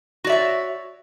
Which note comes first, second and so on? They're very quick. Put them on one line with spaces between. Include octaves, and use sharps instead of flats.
F#4 D5 E5 C#5